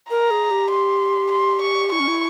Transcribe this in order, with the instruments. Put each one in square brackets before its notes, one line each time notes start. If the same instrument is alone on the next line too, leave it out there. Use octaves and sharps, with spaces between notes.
[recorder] A#4 [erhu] A#5
[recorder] G#4
G4
[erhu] C6
C6
C#6
[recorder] E4 [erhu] C#6
[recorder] C#4
E4